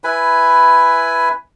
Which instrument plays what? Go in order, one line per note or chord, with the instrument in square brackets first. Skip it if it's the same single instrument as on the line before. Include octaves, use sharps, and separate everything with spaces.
[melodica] E4 B4 G#5 B5